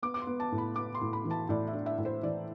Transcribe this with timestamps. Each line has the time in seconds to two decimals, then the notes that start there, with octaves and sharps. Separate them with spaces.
0.02 B3 D6
0.14 D6
0.22 C6
0.27 B3
0.40 A5
0.52 A2
0.58 B5
0.76 B3 D6
0.95 C6
1.01 A2
1.13 B5
1.25 E3
1.31 A5
1.49 A2 D5
1.68 E5
1.73 D4
1.86 E5
1.98 A2
2.05 C5
2.23 E3 D5